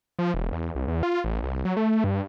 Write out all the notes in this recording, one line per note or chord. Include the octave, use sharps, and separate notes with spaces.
F3
E1
E2
C2
E2
F4
A1
C2
F#3
A3
G2